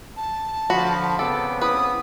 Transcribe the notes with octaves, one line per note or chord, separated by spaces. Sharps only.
A5
D3 F3 F#4 B5
C#3 B3 C4 A4 D6
E4 B4 D#6